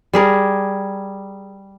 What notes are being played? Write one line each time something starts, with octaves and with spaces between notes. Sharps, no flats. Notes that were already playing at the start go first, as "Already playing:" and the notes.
G3 G#4 A#4